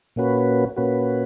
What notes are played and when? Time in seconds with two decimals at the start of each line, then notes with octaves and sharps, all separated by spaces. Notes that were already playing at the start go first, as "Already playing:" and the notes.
0.16 A#2 A#3 C#4 F#4 B4
0.76 A#2 A#3 C#4 F#4 B4